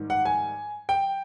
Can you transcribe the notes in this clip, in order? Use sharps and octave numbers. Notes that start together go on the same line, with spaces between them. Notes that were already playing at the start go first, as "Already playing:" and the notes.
Already playing: G#2 D#3 G3
F#5
G#5
G5